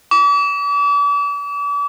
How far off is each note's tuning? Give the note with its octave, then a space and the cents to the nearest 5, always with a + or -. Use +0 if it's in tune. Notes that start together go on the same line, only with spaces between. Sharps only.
D6 -40